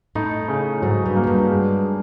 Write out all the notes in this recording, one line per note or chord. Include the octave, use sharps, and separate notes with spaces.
A2 D#4
C#3
G#2 F#3
G2
A#3
F#2
G2
G#3